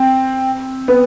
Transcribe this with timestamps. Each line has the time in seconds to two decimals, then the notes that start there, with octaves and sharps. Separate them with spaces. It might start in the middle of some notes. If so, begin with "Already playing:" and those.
Already playing: C4
0.88 B3